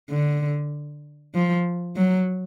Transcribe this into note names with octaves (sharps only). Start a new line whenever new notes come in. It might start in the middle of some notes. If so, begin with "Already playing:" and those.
D3
F3
F#3